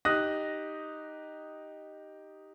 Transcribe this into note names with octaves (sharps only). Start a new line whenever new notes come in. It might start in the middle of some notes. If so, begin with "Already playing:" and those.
D#4 G4 D#6 F#6 A#6